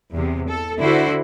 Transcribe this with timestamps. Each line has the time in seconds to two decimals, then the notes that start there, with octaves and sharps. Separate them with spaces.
0.13 E2 C3
0.48 A4
0.78 D3 E4 F#4 C5